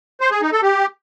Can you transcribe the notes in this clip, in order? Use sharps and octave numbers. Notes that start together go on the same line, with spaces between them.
C5
G#4
D#4
A4
G4